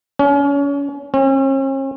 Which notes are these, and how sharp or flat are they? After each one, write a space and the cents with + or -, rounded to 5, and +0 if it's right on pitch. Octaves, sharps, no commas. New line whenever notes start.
C#4 +30
C#4 -45